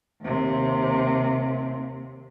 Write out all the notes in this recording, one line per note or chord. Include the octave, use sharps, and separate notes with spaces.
D#2 C3